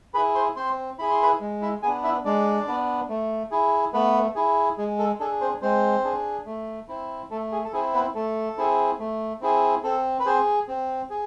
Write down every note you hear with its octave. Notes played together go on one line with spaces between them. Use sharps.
E4 G#4 B4 B5
C5 C6
C4 C5 C6
E4 G#4 B5
C6
B4 B5
G#3
E4 E5
B3 D4 G#4 G#5
E4 E5
G#3 D4 D5
B3 D4
A3
E4 G#4
A3 B3 B4
E4 G#4
G#3 G#4
A4
D4 G#4 A4
C4 C5
G#3 C4 C5
D4 G#4
A3
C4 E4
A3 A4
G#4
A4
C4 E4 G#4
B3 B4
A3 A4
C4 E4 G#4
A3
C4 E4 G#4
C4 A4
B4
C4 G#4 C5
C4
G#4